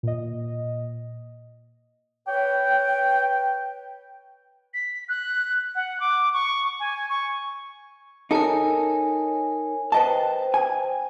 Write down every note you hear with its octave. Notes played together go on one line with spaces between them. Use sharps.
A#2 D#5
B4 C#5 G5
B6
F#6
F#5
D6
C#6
G#5
C#6
D#4 A4 A#4 C#5 G#5
B4 C5 D#5 G5 A5
G#5